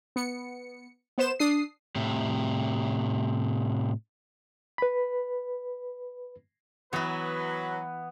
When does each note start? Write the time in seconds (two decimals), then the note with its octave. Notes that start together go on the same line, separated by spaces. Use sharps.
0.16 B3 C#7
1.18 B3 C5 E7
1.39 D4 D#6 C7
1.96 A2 C3
4.78 B4 B5
6.93 E3 F#3 B3 E4 B4